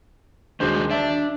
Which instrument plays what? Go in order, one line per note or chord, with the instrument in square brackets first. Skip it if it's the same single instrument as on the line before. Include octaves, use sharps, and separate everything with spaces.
[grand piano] D#1 G#3 C5 [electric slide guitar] D#3 D4 F#4
[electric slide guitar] D4 [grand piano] D5 E5